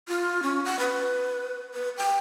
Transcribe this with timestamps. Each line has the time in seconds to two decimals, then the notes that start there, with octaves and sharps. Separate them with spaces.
0.08 F4
0.43 C#4
0.65 F#5
0.79 B4
1.74 B4
1.97 G5